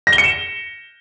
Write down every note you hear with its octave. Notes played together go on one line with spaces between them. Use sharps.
A#6
G7
C#7
E7